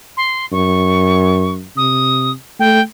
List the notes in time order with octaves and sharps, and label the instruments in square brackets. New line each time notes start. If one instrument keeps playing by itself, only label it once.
[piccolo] C6
[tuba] F#2 [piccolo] C#6
[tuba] C3 [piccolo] D#6
[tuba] A3 [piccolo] G5